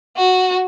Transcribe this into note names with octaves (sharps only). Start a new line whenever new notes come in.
F#4